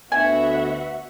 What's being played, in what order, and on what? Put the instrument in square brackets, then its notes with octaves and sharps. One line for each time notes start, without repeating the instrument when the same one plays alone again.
[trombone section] D2 B3 [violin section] F#4 E5 F#5 [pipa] G#5